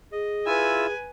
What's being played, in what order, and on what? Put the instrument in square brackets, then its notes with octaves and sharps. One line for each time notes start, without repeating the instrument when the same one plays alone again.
[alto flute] G#4 [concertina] D#5
[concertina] E4 F4 E6 [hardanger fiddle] B4 G#5